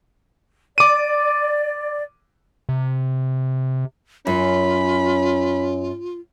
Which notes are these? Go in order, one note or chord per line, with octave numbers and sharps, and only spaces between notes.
D5 D6 D#7
C3
F#2 C#4 F4 B5